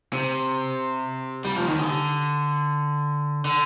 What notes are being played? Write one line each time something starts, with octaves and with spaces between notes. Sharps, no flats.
C3
G3
F3
D#3
D3
D3